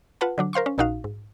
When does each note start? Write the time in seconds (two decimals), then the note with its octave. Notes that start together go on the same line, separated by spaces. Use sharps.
0.21 F4 B4 F#5 A5
0.38 D3 F#3 D4
0.53 A#4 C5 F5 C6 C#6
0.66 C#4
0.78 A#1 A#2 D#4 F#4 F5
1.04 G#2